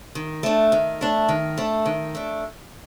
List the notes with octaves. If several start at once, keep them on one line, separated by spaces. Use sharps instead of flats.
D#3
A3 D4
D#3
A3 D4
D#3
A3 D4
D#3
A3 D4